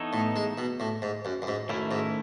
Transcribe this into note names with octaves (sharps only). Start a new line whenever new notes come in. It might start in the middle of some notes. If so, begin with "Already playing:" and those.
Already playing: E3 B3 D#4 A4 C#5
A2
G#3
B2
A2
G#2
F#2
F#2
G#2
F#2 D#3 A3 C#4 E4
G#2